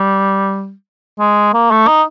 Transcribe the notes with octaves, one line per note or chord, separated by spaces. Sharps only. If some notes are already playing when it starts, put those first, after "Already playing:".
Already playing: G3
G#3
A#3
A3
D#4